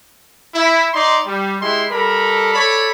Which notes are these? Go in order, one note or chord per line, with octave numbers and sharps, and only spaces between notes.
E4
D#4 D5 C6
G3
G#3 E4 G4 C6
G3 A4 A#4 B5
A4 C#5 D5 B5